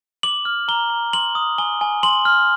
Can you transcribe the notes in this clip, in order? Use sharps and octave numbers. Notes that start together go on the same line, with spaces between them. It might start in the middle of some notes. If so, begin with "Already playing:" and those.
D6 F#7
F6
A#5 G7
A#5
C6 F#7
D#6
G#5 G7
G#5
C6 F#7
F6